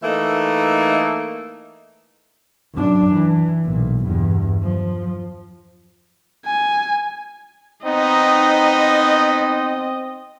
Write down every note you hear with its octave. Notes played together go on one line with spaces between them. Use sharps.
E3 A3 A#3 D#4 E5
F#2 D4
E3
B1 A#2
E2 G2
F3
G#5
B3 C4 D#4 D#5